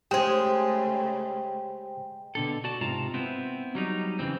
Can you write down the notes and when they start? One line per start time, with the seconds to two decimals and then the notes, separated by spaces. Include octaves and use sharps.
0.11 C#3 G#3 A3 G4 G#4 C5 G5
2.35 B2 D3 A4
2.64 F#4 D5 A5
2.81 G#2 C3 F4 A5 A#5
3.14 B3 C4 E4
3.75 F#3 G3 D#4
4.19 C#3 E3 C4